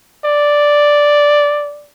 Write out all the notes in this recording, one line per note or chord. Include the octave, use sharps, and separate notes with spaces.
D5